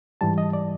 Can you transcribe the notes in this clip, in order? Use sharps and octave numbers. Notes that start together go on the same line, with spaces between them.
G#2 E3 G3 A5
D#5
D5